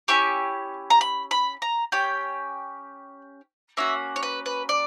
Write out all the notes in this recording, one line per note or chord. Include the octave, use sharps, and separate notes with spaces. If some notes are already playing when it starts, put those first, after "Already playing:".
C#4 E4 G4 C#6
A#5
B5
B5
A#5
C#4 G4 G5
A#3 C#4 F#4 E5
C#5
B4
B4
D5